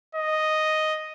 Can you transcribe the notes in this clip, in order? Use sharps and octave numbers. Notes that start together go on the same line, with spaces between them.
D#5